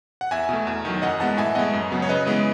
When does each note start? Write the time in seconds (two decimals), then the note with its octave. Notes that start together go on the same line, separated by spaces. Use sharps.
0.21 F#5
0.31 E2 E5 G#5
0.49 B2 A3
0.67 E2
0.85 D#3 F#3
1.02 F#2 D#5 F#5
1.20 E3 G#3 B3 F#5 A5
1.37 A2 E5 G#5
1.55 G#3 B3 D#5 F#5
1.73 F#2
1.91 C#3 F#3 B3
2.02 C#5
2.09 C#3 B4 D#5
2.26 E3 G#3 B3